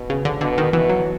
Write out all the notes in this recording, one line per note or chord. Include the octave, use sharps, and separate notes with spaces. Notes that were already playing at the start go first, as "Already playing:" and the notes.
Already playing: B2
C#3
D3
B2 D3
D#3
B2 E3
F#3